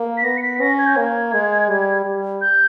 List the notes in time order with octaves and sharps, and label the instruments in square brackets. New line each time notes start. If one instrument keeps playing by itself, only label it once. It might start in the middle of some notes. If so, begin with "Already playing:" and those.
Already playing: [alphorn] A#3
[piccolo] B6
[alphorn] B3 [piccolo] A#6
[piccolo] C#7
B6
[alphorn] C#4 [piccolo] A#6
[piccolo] G#6
G6
[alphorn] A#3 [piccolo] G#6
[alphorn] G#3
G3
G3
[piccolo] G6